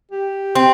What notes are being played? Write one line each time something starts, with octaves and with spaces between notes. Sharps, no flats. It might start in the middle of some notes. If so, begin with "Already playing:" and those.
G4
C4